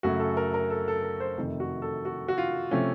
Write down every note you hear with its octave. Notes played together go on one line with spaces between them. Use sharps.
F#2 C#3 F#3 A3 F#4
A4
A#4
A#4
A4
A4
A#4
C5
F2 C3 D#3 A3
F#4
A4
F#4
F#4
F4
C3 F3 A3 C#4